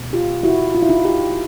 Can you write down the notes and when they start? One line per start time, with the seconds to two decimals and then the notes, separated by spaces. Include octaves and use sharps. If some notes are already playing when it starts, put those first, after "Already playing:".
Already playing: B2 F#3 A3
0.13 F4 G4
0.43 E4 F#4
0.75 F4
0.82 E4
0.89 D#4 F4
1.05 F4 G4